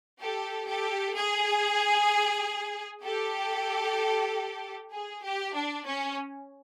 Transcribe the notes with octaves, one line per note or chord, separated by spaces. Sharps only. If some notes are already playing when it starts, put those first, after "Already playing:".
G4 A4
G4 A4
G#4
G4 A4
G#4
G4
D4
C#4